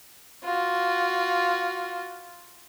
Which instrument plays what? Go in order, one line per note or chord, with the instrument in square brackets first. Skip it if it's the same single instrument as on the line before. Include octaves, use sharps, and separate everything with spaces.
[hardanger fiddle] F4 F#4